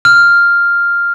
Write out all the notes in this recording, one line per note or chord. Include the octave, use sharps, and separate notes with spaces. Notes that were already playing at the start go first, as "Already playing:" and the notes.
F6